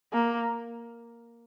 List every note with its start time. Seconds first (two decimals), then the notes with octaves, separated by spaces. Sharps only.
0.12 A#3